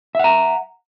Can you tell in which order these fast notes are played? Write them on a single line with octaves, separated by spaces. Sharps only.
E5 F#5 A#5